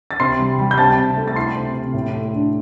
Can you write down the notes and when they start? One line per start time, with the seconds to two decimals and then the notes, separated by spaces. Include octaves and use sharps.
0.11 A6
0.20 C3 C6 C7
0.39 G3
0.59 G3
0.71 G6
0.78 C3 A5 A6
0.98 C3
1.17 A3
1.28 A6
1.36 E4 C6 C7
1.56 C3
1.75 C3
1.94 A2
2.13 A3
2.33 D4